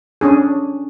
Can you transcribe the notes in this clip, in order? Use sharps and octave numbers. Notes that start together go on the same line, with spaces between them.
C#4 D4 G#4